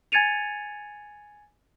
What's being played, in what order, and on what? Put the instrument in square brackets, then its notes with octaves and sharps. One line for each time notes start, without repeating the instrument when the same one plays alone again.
[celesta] G#5 G#6 A6 C#7 D#7 F7